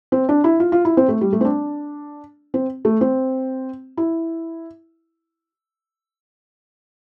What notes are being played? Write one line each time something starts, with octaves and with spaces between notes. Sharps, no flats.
C4
D4
E4
F4
F4
E4
C4
A3
G3
A3
C4
D4
C4
A3
C4
E4